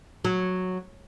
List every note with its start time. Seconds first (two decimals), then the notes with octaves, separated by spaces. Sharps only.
0.25 F#3